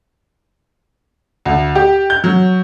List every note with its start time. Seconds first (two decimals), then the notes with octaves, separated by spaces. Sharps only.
1.46 D2
1.75 G4
2.10 G6
2.24 F#3